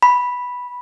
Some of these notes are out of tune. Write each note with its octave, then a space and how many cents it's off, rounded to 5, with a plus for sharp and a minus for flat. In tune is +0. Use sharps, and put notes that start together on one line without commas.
B5 -5